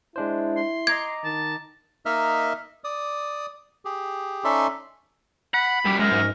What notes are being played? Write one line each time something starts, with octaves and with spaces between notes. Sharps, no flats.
G#3 D4 E4 C5
C6
D#5 A#5 D6 G#6
D#3 A5
A#3 D#4 D#5 E5 F6
D5 D#6
G4 G#4
C#4 D#4 A4 D5 E5 C6
F#5 B5
F#2 G3 G4
F#2 G#3 A#4
G#2